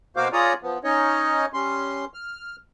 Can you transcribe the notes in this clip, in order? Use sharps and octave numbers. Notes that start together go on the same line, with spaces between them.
B2 A#3 F#4 C5 F5 D6
F4 G#4 C#5 D5 A#5 D#6
F3 B3
C#4 D#4 C#5 D#5
G3 C#4 C6
F6